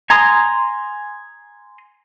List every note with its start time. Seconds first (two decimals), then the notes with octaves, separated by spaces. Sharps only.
0.10 G#5 A#5 C6 D#6